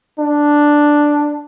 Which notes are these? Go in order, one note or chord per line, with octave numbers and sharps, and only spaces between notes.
D4